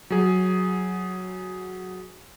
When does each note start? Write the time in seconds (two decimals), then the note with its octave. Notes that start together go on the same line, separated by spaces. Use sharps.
0.10 F#3 G#4